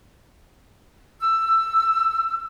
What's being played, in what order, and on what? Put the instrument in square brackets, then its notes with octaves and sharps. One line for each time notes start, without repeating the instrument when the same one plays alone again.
[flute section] E6